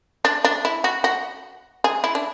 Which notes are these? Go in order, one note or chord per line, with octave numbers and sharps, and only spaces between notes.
D4
D4
E4
F#4
F#4
G#4
E4
D4